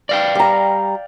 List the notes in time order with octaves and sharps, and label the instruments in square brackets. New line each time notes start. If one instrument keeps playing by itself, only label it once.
[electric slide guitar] D5 F5 G5
[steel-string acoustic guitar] G3 A#5